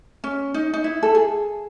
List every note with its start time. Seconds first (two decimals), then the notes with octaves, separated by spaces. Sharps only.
0.24 C#4
0.54 D#4
0.74 D#4
0.84 E4
1.03 A4
1.15 G#4